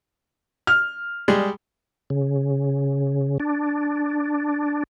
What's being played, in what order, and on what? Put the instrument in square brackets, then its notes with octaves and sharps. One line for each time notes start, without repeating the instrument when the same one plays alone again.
[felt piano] F6
[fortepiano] G3 G#3 G#4
[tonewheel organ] C#3
D4